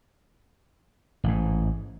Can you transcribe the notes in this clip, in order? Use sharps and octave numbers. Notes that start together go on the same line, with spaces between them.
A1 G#2